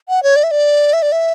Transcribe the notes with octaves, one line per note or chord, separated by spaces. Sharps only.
F#5
C#5
D5
E5
D5
E5
D5
E5